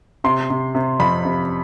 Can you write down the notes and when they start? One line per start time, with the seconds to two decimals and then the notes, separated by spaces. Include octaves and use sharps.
0.24 C3 C6
0.50 C3
0.75 C3
1.00 F2 B5
1.25 C3